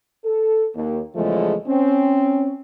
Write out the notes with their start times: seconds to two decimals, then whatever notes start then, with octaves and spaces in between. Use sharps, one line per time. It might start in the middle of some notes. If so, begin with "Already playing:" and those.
0.24 A4
0.74 D#2
1.15 E2 C#3 F3 G#3 A3
1.67 C4 C#4